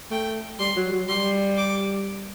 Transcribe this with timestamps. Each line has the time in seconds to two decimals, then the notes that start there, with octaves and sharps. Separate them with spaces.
0.11 A3 G5
0.60 G3 C6
0.77 F#3
0.92 F#3
1.09 G3 C6
1.57 D6